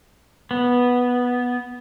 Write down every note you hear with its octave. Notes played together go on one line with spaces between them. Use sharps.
B3